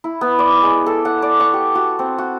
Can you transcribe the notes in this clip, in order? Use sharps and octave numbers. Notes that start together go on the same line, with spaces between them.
E4
B3
D5
G#3
A4
F#5
D5
C#6
G4
F#4
C4
F#4